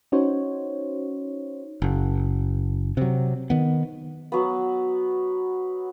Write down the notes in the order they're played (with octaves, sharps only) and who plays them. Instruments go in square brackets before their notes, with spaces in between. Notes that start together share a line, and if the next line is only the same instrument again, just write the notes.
[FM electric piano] C#4 D#4 F#4 C5 C#5
[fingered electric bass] F#1
C3 F#3
D#3 B3
[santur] F#3 B3